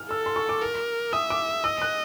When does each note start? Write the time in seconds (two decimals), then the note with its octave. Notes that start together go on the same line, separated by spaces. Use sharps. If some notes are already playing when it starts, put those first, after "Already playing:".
Already playing: F6
0.10 A4 E6
0.26 C6
0.36 C#6
0.49 D6
0.62 A#4
1.13 E5 D#6
1.30 D6
1.64 D#5 E6
1.82 F#6